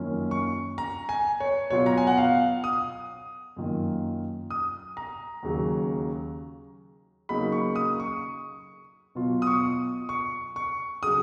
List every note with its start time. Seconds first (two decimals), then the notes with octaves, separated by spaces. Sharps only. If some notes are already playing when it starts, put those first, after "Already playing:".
Already playing: F#2 D#3 A#3 C#4 F4
0.31 C#6
0.78 A#5
1.09 G#5
1.40 C#5
1.70 B2 F#3 B3 F4 C#5
1.86 A#5
1.98 G#5
2.07 F#5
2.17 F5
2.64 D#6
3.56 F#2 D#3 A#3 F4
4.51 D#6
4.97 A#5
5.43 D#2 C#3 F#3
7.29 C#3 F#3 A#3 D#4 B5
7.52 C#6
7.76 D#6
8.00 C#6
9.15 B2 F#3 B3 F4
9.42 D#6
9.47 C#6
10.09 C#6
10.56 C#6
11.03 C#3 F#3 D#6